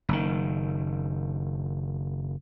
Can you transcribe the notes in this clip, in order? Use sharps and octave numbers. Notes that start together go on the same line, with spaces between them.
F#1 D#3